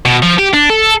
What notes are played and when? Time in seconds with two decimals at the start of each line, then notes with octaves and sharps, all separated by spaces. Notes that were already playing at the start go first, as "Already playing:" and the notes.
0.05 B2
0.22 F3
0.39 G4
0.54 D4
0.70 A4